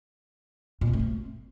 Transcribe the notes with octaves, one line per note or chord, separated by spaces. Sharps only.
A#2
C4
A3
C4